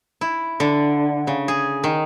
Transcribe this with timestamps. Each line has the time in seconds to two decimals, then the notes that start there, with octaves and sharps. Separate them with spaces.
0.21 E4
0.60 D3
1.27 C#3
1.48 G#4
1.84 D#3